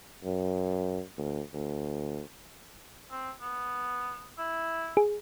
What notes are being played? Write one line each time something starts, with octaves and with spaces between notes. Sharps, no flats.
F#2
D2
D2
C4
B3
E4
G#4